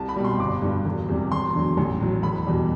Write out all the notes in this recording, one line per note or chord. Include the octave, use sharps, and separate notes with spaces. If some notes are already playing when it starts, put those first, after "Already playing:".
Already playing: C2 A5
B5
B2 G3
C6
G1 D6
G2 D3
E1
E2 C3 G3
E1 C6
E2 D3 F#3
A1
A2 F#3
E1 B5
E2 B2 G3